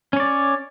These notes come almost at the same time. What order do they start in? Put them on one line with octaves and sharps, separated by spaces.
C#4 C#5 D5